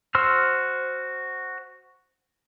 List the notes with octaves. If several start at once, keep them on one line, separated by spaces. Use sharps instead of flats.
F#4 C5 C6 E6 F6